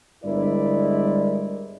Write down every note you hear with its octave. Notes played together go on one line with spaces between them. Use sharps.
G1 G2 G#3 E4 A#4 D5